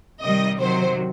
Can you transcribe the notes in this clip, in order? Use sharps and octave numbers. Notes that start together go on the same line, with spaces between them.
C3 D#3 G3 D#5
C3 D#3 F#3 C5